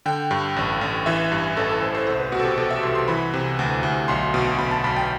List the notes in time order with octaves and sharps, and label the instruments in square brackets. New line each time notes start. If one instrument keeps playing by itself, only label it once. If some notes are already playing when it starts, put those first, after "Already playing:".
[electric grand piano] D3 G5
G2
A1
A1
E3 E5
G2
A1 A4
A4
A1 C5
C5
C2 C5
B4
B2 F#4
A4
G4
B2 A4
E5
C2 C6
C6
E3 B5
C3
D2
D2
B1 C6
B2
B2 B5
A5
B1 B5
G5